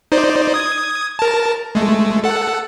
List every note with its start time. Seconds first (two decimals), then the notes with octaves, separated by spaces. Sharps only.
0.12 D#4 C5 D5
0.54 D#6 G#6
1.19 A#4 A5
1.75 G#3 A3
2.24 A4 F#5